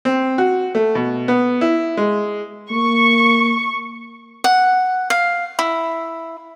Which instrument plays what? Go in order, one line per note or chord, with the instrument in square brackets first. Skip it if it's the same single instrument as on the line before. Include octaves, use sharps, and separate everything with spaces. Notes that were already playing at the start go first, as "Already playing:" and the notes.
[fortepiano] C4
F#4
A3
B2
B3
E4
G#3
[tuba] A#3 [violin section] C#6
[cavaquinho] F#5
F5
E4